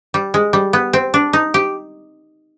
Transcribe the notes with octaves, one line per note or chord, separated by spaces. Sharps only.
G3
G#3
G3
B3
C4
D4
D#4
G4